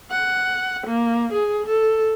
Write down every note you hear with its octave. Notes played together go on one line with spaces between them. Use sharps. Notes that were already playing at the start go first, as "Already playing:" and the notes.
F#5
A#3
G#4
A4